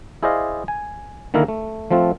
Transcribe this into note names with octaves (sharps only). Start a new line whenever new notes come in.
E4 G#4 C5 D5 D#5 F5
G#5
D3 D#3 A#3 E4 A#4
A3
F3 A3 C4 F4